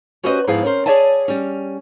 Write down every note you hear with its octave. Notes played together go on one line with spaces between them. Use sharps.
C#4 F#4 G4 B4 C5 D#5
G#2 F3 B3 E4 G#4 F5
C4 C#4 F4 A#4 C5
G#4 C#5 D5 E5 G#5 A5
G3 C#4